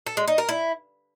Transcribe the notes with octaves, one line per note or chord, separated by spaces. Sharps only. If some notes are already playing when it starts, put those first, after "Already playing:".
A4
G#3
D#4
A#4
E4